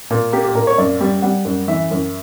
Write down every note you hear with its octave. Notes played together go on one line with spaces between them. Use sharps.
A#2
A#3 G4
G4
A#2 A#4
C#5
F#2 D5
G3
G3 F#5
F#2
E3 E5
F#2